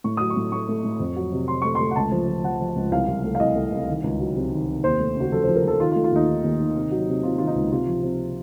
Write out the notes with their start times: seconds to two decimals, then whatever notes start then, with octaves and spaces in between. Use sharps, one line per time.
0.04 A2 C#6
0.17 F#3 D#6
0.30 C#6
0.36 A2
0.52 A3 C#6
0.69 A3
0.84 A2
1.00 F2
1.16 F#3
1.32 C3
1.48 C3 C6
1.62 A3 C#6
1.75 A3 C6
1.91 F#5
1.96 C#2 A5
2.12 F3
2.28 F3
2.44 F3 F#5
2.60 F3
2.76 C#2
2.92 C2 F5
3.08 C2
3.24 A3
3.35 F5
3.40 C2 D#5
3.56 A3
3.72 C2
3.88 D#3
4.04 C#2
4.20 F#3
4.36 C3
4.52 D#3
4.68 C3
4.84 D#2 C5
5.00 A3
5.16 C#3 F#4
5.31 F3 A4
5.44 C5
5.47 F3
5.56 A#4
5.64 F3 A4
5.80 D#3 F4
5.91 F4
5.96 A3
6.04 F4
6.12 D#2 D#4
6.27 D#3
6.44 D#2
6.60 D#3
6.76 C3
6.91 F#3
7.08 C3
7.23 C3 F4
7.38 D#3 F4
7.47 D#4
7.56 C#2
7.72 C3 F4
7.87 F3
8.03 C3